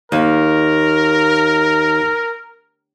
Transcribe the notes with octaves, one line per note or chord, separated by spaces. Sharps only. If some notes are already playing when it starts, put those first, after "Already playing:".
D#2 A#4